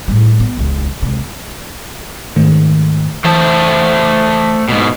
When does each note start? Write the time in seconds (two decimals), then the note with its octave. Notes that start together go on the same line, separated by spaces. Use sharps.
0.08 A2 G3
0.40 B3
0.57 E1 C#2
1.02 C#2 C3
2.36 G#2 D#3 A3
3.24 E3 A3 C5 A5
4.69 G#2 B2